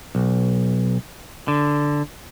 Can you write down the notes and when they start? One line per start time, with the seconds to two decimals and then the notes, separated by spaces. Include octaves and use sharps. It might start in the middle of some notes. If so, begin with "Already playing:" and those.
0.15 B1
1.48 D3